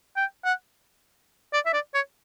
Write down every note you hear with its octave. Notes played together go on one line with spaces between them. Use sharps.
G5
F#5
D5
E5
D5
C#5